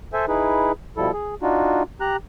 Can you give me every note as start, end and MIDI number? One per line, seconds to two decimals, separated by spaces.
0.13 0.25 69
0.13 0.25 72
0.13 0.25 76
0.13 0.25 80
0.28 0.72 63
0.28 0.72 64
0.28 0.72 68
0.28 0.72 71
0.97 1.12 47
0.97 1.12 53
0.97 1.12 55
0.97 1.12 64
0.97 1.12 69
1.13 1.35 68
1.42 1.83 62
1.42 1.83 63
1.42 1.83 65
1.42 1.83 66
2.01 2.16 67
2.01 2.16 82
2.01 2.16 90